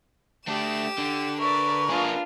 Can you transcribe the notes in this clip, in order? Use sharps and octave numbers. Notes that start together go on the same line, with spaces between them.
A3 D4 G4 E7
D3
A#4 B4 D5 E5 C#6
A#3 D4 F4 G#4